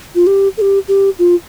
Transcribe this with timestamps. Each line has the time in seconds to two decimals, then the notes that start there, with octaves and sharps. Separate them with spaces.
0.15 F4
0.27 G4
0.57 A4
0.61 G4
0.88 G4
1.19 F4